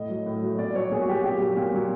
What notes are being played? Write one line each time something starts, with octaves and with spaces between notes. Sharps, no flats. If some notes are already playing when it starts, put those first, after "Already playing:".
Already playing: A2 D#5
F#3
A2
F#3
A#2 D5
F#3 C#5
A#2 G#4
F#4
F#3 G4
A#2 G4
F#3
A#2
F#3